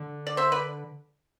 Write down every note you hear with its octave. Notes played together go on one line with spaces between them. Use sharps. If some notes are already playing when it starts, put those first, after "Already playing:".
Already playing: D3
D5
C5 E5
B4 D5